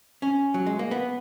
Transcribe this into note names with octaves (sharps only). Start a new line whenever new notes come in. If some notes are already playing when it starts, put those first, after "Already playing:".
C#4
F#3
G#3
A#3
B3